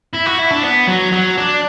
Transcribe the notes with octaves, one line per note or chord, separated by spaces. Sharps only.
E4
F#4
E4
D4
B3
F#3
F#3
D4